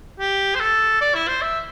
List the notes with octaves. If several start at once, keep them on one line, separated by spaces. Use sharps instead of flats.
G4
C5
A4
D5
E4
C5
E5